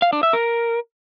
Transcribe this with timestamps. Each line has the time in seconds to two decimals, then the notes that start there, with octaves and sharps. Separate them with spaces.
0.02 F5
0.13 D4
0.23 E5
0.33 A#4